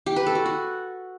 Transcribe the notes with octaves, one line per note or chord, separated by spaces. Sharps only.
G4
B4
A4
F#4
F#4